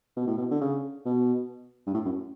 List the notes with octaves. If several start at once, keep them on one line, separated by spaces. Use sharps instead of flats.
B2
A2
B2
D3
C#3
B2
G2
A2
F#2